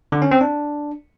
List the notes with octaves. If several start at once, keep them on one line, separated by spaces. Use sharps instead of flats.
D3
C#4
C4
D4